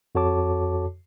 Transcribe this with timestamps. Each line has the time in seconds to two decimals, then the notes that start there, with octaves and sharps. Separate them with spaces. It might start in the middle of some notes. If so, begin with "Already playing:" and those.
0.15 F2 F#4 A4 C#5 A5 D6